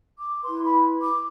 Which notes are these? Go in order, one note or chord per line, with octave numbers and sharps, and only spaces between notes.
D6
E4 B4 C6
B5
D6